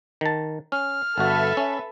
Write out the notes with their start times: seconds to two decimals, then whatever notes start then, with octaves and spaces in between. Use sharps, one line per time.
0.21 D#3 A5
0.72 C#4 F6
1.18 G1 F#4 A4 B4 E5
1.57 C#4